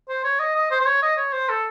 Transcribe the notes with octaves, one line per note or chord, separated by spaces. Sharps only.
C5
C#5
D#5
D#5
C5
C5
C#5
D#5
C#5
C5
A4